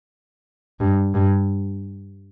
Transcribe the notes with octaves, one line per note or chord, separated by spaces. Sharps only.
G2
G2